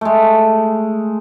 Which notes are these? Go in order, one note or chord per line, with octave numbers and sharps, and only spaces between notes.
G#3 A3